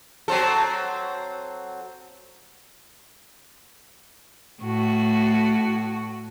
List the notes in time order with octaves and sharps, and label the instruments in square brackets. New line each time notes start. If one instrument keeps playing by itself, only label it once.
[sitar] F#3 C4 A4
[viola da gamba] A2 F#4